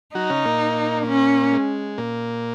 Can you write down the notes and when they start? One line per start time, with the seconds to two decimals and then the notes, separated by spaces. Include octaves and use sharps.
0.15 F#3 D#4 F#4
0.30 C#3 C#4
0.45 A#2 A#3
1.07 C#4
1.52 G#3
1.98 A#2 A#3